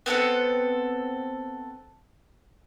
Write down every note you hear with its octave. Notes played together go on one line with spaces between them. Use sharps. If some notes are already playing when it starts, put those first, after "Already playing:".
B3 C4 A4 F#5